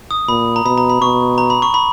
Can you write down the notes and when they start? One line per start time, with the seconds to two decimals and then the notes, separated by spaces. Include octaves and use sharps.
0.11 D#6
0.28 A#2 B5
0.56 A#5
0.65 B2 B5
0.78 A#5
0.89 B5
1.01 B2 C#6
1.38 A#5
1.50 B5
1.62 C#6
1.74 B5